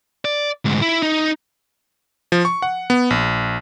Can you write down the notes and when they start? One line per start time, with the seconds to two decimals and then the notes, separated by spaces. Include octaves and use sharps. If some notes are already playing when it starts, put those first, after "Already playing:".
0.25 D5
0.65 D2 G#2
0.82 E4
1.03 D#4
2.32 F3
2.45 C#6
2.62 F#5
2.90 B3
3.10 A#1